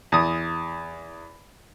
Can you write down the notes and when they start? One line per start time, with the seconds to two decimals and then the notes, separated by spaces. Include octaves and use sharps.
0.12 E2 D#6